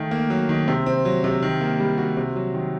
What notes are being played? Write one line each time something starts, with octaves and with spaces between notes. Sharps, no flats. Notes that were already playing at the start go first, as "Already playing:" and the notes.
Already playing: D#3 A3
A#3
F#3
D#3
C3
C4
F#3
C3
D#3
A#3
G3
F#4
C3
F#3
D#3